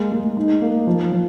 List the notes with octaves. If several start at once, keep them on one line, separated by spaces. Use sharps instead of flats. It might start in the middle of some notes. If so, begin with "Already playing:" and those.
Already playing: G#3 A#3
G#3
D#4
A#3
F3
F3